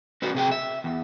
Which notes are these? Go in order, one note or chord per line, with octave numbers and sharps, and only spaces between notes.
C#4 F#4 A#4 B4
C3 G#4 G5
E5
E2